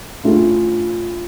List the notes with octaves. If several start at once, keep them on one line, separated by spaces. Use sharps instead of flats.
A2 A3 C#4 F4